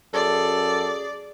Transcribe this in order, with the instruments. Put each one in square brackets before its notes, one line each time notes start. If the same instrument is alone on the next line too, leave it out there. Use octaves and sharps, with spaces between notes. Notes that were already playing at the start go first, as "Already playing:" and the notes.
[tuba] F#2 [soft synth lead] G#4 [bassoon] A4 [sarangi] D5